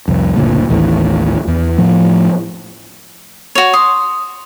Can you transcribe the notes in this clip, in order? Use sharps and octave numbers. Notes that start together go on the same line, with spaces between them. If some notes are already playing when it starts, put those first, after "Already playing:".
C2 F2
F#1 D2 A#2
A1 D#2 A2 E3
E2
A2 F3 A3
F#4 C#5 F7
C6 D#6